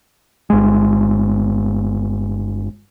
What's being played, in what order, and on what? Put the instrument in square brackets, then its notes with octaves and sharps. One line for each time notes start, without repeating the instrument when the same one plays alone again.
[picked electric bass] G1 G#3